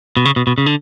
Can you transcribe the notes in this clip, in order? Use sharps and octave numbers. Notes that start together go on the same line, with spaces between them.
B2
C#3
B2
B2
C#3
D3